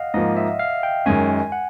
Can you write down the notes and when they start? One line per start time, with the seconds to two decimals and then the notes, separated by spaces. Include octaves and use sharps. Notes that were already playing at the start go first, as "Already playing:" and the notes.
Already playing: D#5 F5 F#5
0.14 G#2 F3 A#3 D#5
0.37 E5
0.59 F5
0.83 G5
1.06 F#2 D#3 G#3 C#4 G#5
1.52 F#5